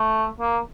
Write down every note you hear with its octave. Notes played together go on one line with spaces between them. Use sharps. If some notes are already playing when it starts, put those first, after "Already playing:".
Already playing: A3
A#3